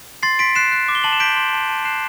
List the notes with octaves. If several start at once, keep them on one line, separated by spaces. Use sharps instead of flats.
C6 A6 C7
C6 B6 D7
F#6 C7 E7
F#6
D6
G7
A5 F#7
E7
G6 B6 D7
C6
A5
A5
F#6 C7 E7